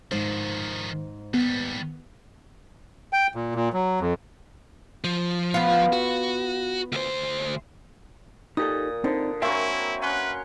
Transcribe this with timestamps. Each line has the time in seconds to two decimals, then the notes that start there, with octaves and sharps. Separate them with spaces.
0.12 G#2 D#3 F3 C5
1.34 D#2 G3 B3
3.13 G5
3.35 A#2
3.55 A#2
3.73 F#3
4.00 F2
5.04 F3
5.54 B3 F4
5.93 F#4
6.92 D2 C5
8.57 A#2 D#4 G4 A4 D#6
9.04 D3 C4 D#4
9.42 F#3 A#3 C4 E4 E5 F5 G#5 C#6
10.02 C#4 B4 F#5 C6 F#6